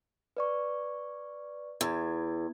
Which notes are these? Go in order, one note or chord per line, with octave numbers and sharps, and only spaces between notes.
B4 D5 C#6
E2 G#6